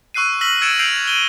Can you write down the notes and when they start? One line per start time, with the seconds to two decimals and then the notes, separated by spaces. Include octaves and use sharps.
0.14 C#6 E6 F#6 C7 D#7
0.41 C#6 E6 F6 A#6 B6 F#7
0.61 E6 G#6 A6 C#7 D7 E7
0.79 E6 G6 A6 C7 D7 F7
1.07 D#7 G7